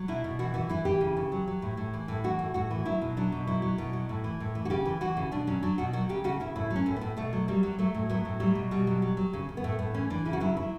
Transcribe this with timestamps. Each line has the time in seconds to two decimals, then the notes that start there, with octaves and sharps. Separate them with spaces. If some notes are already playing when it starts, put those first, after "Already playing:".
Already playing: F#3
0.08 B2 E4
0.24 B2
0.39 E3 F#4
0.54 E3 F#4
0.69 E3 E4
0.85 E3 G4
1.01 C#3
1.17 C#3
1.32 F#3
1.47 F#3
1.62 A2
1.77 A2
1.94 E3
2.08 A2
2.24 E3 F#4
2.39 A2
2.54 A2 F#4
2.70 E3
2.85 F#3 E4
3.02 B2
3.17 F#3 D4
3.32 B2
3.47 F#3 E4
3.62 F#3
3.78 B2
3.93 F#3
4.09 A2
4.24 E3
4.40 A2
4.55 E3
4.65 F#4
4.70 C#3 G4
4.85 E3
5.01 E3 F#4
5.17 C#3
5.32 B2 D4
5.47 F#3 C#4
5.63 F#3 D4
5.78 B2 F#4
5.93 F#3 F#4
6.09 C#3 G4
6.24 C#3 F#4
6.40 C#3 E4
6.55 A2 E4
6.70 F#3
6.76 C#4
6.86 A2
6.96 A2 B3
7.17 B2 A3
7.33 F#3
7.48 F#3 G3
7.63 F#3
7.78 F#3 A3
7.94 A2
8.09 F#3 B3
8.25 A2
8.40 F#3 G3
8.55 B2
8.71 B2 G3
8.87 F#3
9.02 F#3
9.17 F#3
9.33 C#3
9.49 C#3
9.57 B3
9.64 A2 A3
9.79 A2 B3
9.94 E3 C#4
10.10 E3 D4
10.25 C#3 E4
10.33 F#4
10.40 F#3 E4
10.57 F#3 E4